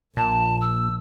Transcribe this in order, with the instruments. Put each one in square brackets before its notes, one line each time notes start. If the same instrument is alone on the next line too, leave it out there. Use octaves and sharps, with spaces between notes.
[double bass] A#1 [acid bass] A#2 [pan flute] A5
[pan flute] E6